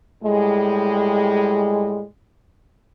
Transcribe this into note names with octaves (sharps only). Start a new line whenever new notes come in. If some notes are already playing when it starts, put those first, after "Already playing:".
A2 G3 G#3